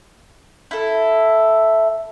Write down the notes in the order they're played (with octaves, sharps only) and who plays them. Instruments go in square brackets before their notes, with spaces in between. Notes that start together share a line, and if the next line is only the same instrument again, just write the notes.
[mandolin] E4 A4